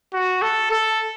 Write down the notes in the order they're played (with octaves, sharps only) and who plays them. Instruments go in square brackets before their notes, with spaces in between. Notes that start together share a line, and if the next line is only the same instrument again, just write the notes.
[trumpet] F#4
A4
A4